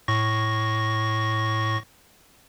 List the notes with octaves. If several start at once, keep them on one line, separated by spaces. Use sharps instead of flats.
A2 C#6 A#6